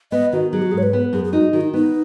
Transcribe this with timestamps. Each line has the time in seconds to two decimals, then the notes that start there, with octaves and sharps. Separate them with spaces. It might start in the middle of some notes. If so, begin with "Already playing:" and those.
0.12 B3 D#5
0.33 D#3 F#4
0.52 F#3 G#4
0.62 F#4
0.72 G#2 G#4
0.78 C#5
0.83 B4
0.93 B3
1.13 F#2 G#4
1.24 G#4
1.33 D#4 F#4
1.53 D#3 F#4
1.61 D#4
1.73 B3 D#4